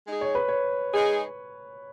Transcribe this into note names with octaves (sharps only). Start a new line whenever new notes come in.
G#3 D#4 G#4
C#5
B4
C#5
G#3 D#4 G#4